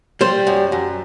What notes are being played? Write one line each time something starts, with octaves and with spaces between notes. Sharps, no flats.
G3 C5
F#2
F#2